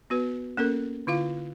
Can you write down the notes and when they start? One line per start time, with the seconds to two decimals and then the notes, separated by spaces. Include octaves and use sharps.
0.10 B3 F#4 B4
0.57 A#3 C#4 A4 A#4
1.07 D3 E4 F4 F5